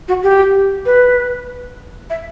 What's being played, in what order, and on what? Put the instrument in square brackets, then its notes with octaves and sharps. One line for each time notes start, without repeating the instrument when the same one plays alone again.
[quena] F#4
G4
B4
E5